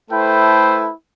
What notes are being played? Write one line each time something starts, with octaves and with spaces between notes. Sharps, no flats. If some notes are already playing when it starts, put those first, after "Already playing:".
A3 E4 A4 B4 C5 G5